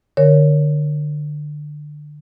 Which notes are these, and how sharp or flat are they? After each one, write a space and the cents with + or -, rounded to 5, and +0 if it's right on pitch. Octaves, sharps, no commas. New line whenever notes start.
D3 +20 A#4 +0 C#5 +0